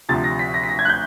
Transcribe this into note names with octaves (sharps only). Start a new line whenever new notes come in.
D2 C3 F3 A6
A#6
B6
A#6
B6
A#6
G#6
F#6
G6